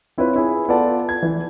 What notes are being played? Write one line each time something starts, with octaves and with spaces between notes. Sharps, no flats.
C4 E4 F4 B4 C#5
E4 G#4
B3 F4 A4 D5 A5
G#6
E3